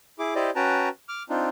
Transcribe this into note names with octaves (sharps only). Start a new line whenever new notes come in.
E4 G#4 D6
E4 G4 C5 D5 D#5
C#4 F#4 B4 G5 A5 A#5
D6 F6
C4 D4 D#4 F4